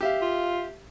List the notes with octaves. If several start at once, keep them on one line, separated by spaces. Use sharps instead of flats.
G4 E5 F5
F4